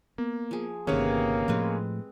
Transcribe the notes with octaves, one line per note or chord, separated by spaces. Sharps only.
A#3 B3
F3 G#4
G1 C3 D#3 A#3 B3 C#4 G#4 C#5
A2 F3 G#3 A3 C4 B4